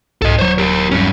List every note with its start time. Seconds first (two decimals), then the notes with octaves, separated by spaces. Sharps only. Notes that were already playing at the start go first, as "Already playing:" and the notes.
0.22 C2 G#2 A4 D#5
0.39 D#1 F#3 C5 C#5
0.58 G4 A#4
0.91 G2 C#4